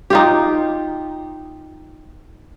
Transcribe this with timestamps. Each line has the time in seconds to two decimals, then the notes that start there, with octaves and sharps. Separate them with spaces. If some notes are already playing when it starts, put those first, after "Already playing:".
0.10 D#4 F4 G4